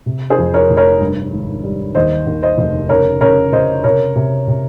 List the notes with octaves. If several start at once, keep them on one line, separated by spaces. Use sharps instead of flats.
C3
G#4 C5
F2
A#4 C#5
F1
A#4 C#5
G2
G#1
G3
D#2 C5 D#5
D#2
C5 D#5
F1
C#3 A#4 C#5
C#3 A#4 C#5
C#3 C5 D#5
C3 A#4 C#5
C3
C3